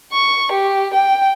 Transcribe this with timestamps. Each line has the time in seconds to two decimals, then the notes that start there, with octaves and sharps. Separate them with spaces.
0.12 C#6
0.52 G4
0.94 G5